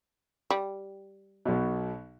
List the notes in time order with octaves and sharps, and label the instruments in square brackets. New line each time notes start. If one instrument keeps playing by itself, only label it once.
[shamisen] G3
[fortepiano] B1 B2